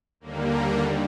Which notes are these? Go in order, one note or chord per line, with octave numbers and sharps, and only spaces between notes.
D#2 D3 G3 A#3